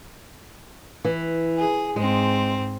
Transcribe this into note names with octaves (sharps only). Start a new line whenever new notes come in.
E3
G#4
G#2 G#3 C4